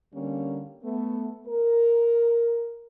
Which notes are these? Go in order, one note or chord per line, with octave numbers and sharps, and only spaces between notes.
D3 G3 A#3 C#4
A3 B3
A#4